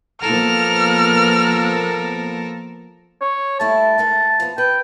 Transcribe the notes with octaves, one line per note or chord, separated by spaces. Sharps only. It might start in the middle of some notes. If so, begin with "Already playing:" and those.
F3 A#3 B3 A4 A#4 F6
C#5
G3 A3 E4 A5
G#3 D#4 A#4
F3 B3
B4 G5